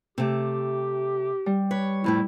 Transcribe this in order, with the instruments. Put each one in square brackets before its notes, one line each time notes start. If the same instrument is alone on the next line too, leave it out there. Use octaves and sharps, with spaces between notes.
[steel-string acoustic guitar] C3 A3 [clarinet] G4
[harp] G3
[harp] B4 [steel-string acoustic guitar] C#5
[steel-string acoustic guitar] F2 A2 G3 [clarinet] E4